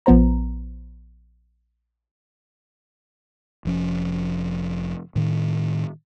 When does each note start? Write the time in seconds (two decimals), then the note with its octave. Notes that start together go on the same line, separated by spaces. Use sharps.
0.06 A#1 F3 B3 C5 A#5
3.65 F1 F3 C#4
5.16 A2 D#3